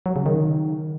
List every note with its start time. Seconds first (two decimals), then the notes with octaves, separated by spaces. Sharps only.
0.06 F#3
0.16 C#3
0.26 D#3